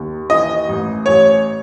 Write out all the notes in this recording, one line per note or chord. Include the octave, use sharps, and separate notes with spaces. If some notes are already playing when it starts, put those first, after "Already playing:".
Already playing: D#2
E3 D#5
A1
A1 C#5